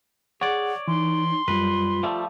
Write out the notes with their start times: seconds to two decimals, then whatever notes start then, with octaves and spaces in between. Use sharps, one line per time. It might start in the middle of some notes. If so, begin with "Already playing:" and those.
0.41 G#4 C#5 D5 F#5
0.88 E3 D#4 C6
1.31 D#4
1.48 F#2 G3 F4 B4
2.03 F3 G3 A3